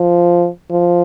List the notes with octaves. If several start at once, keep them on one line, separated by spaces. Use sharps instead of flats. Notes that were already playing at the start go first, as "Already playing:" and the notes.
Already playing: F3
F3